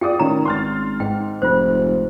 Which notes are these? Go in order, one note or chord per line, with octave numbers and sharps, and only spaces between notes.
F4 G#4 D5 G5 D#6
A2 D#3 C#4 A#5
G#1 C6 F6 A6
G#2 G5
F1 F4 C5